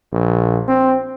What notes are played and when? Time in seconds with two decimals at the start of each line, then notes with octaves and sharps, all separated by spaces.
0.12 A#1
0.68 C4